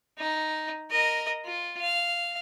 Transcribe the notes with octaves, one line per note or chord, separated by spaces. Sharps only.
D#4
A#4 D#5
F4
F5